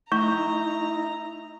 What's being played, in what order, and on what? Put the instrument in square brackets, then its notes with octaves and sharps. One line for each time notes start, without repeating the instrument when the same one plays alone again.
[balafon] A3 [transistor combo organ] D#4 E4 [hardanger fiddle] A#5 [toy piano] C#6